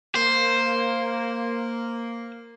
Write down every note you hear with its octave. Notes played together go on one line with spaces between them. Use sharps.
A#3 C5